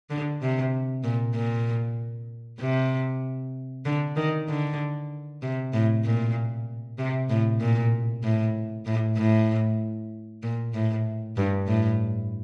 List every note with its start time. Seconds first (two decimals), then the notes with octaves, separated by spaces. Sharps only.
0.10 D3
0.42 C3
1.04 A#2
1.35 A#2
2.60 C3
3.86 D3
4.16 D#3
4.49 D3
5.43 C3
5.73 A2
6.05 A#2
6.98 C3
7.30 A2
7.61 A#2
8.24 A2
8.86 A2
9.17 A2
10.43 A#2
10.74 A2
11.37 G2
11.68 A2